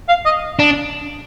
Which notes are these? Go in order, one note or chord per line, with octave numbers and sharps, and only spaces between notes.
F5
D#5
D4